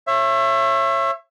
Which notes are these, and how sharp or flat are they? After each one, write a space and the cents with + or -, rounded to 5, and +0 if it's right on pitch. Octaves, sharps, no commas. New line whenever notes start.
C#5 -30 E5 +25